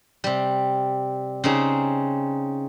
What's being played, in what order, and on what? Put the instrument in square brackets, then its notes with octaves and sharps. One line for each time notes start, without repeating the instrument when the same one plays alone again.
[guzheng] C3 G3
C#3 C4 D#4 G#4